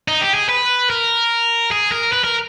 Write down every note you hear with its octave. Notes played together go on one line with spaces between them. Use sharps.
D#4
G4
G#4
B4
A#4
G#4
A#4
B4
A#4